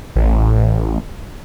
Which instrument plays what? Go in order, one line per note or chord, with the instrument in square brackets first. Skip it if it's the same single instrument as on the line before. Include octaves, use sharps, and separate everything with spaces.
[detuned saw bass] A1